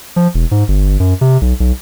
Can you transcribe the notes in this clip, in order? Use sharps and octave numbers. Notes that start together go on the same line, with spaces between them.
F3
E1
G#2
G1
F#2
C3
B1
B1